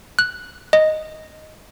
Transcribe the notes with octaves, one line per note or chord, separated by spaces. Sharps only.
F#6
D#5